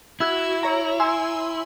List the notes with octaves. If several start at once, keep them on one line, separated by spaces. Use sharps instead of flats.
E4 F#4 E6 G#6
C#5 A#5
G#5 C6 E6